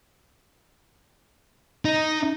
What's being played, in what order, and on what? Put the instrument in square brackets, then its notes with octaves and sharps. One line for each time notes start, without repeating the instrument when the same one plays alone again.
[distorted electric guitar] D#4